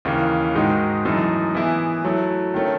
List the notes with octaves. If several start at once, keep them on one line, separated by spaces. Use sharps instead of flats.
D#2 C#3 E3
G#2 D#3 G#3 D#4 F#4
F#2 E3 A3 D#4 A4
E3 B3 E4 G#4
F#3 A3 E4
D#3 A3 C#4